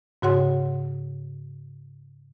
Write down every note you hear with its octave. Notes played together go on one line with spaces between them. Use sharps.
G#2 C#3 F#4 C#5 F#5 C6